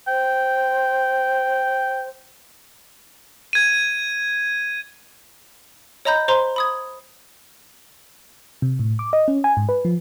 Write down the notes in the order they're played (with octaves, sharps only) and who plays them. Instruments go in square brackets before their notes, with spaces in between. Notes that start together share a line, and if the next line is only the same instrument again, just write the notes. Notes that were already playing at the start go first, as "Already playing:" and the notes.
[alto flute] C5 [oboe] G5
[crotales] G#6 D#7
[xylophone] C#5 D#5 A#5 B5 G6
C5 A#5 C6
B5 D#6 G#6
[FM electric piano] C3
A2
D6
D#5
C#4
G#5
G#2
B4
F3